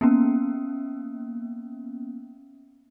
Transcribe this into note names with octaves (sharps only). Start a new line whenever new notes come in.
A#3 B3 C#4